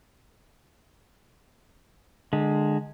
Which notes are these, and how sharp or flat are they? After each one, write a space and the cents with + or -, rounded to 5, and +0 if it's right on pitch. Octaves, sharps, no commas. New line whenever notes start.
D3 +20 G#3 +0